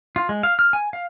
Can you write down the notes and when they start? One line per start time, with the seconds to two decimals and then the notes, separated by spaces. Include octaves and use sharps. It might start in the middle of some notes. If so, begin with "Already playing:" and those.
0.16 F4
0.29 G#3
0.43 F5
0.59 F6
0.73 G#5
0.93 F5